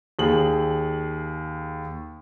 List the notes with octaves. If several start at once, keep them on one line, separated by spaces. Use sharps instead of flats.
D#2 G#4 F#7